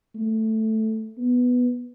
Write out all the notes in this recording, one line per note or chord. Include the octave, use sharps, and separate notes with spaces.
A3
B3